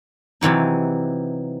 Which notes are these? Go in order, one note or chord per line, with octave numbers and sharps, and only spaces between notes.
C3 E3 F#3 D#4